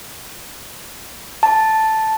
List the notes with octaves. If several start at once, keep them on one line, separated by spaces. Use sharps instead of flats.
A5